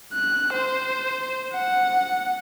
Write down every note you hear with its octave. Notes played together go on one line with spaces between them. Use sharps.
F#6
C5
F#5